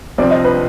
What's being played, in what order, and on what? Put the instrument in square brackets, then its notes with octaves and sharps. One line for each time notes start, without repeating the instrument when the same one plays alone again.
[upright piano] C2 C3 F3 C4 [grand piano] D5
[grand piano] D#5
B4